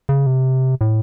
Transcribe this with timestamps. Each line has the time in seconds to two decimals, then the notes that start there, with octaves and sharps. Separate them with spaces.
0.09 C#3
0.26 C3
0.81 A2